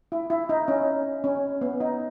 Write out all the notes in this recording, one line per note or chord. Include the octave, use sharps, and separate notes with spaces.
E4
E4
D#4
C#4
C#4
B3
D#4